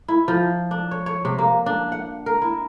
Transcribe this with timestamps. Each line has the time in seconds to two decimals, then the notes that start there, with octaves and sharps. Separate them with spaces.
0.08 E4
0.28 F3
0.71 D4
0.91 C#5
1.06 C#5
1.25 C3
1.38 A#3
1.66 D4
1.92 F#5
2.26 A#4
2.42 E4